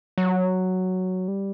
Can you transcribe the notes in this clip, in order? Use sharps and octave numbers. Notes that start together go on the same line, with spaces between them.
F#3
G3